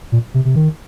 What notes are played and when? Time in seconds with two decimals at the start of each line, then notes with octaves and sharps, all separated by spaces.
0.12 A#2
0.34 C3
0.45 C3
0.56 D#3